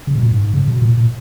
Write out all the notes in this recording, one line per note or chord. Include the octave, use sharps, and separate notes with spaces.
C#3
B2
A#2
G#2
C#3
B2
A#2
A#2